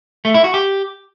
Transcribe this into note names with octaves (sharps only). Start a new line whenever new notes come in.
A3
E4
F#4
G4